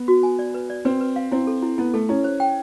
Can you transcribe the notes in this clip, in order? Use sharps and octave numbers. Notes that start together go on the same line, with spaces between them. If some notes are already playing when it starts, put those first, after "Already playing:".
Already playing: B3
F#4
G#5
D5
B4
D5
C4 B4
B4
F5
C4 E4
A4
E4
B3 E4
A3 A4
C#4 E4
C5
G5